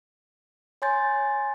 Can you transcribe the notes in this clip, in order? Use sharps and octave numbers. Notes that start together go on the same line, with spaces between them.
C#5 G#5 C6 G6 A6